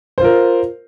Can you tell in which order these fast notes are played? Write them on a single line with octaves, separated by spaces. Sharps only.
C5 F4 A#4